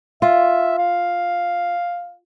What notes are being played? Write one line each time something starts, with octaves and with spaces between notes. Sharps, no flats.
F4 E5
F5